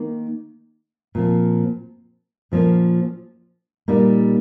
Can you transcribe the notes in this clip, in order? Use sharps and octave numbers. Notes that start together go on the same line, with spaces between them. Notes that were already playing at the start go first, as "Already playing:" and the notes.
Already playing: D#3 A#3 D#4
A#2 F3 C4
A#2 F3 A#3 C#4
A#2 G3 A#3 D#4